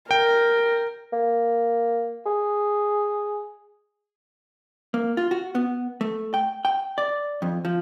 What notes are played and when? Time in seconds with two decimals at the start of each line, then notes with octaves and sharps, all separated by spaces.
0.11 A#4 G5
1.13 A#3
2.26 G#4
4.94 A#3
5.17 F4
5.31 F#4
5.55 B3
6.01 A3
6.34 G5
6.65 G5
6.98 D5
7.42 F2
7.65 F3